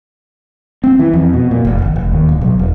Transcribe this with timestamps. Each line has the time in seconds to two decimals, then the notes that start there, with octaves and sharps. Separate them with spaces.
0.84 C4
0.99 E3
1.13 F2
1.33 B2
1.51 A#2
1.65 F1
1.82 G#1
1.96 F1
2.12 D#2
2.29 D1
2.41 B1
2.59 E1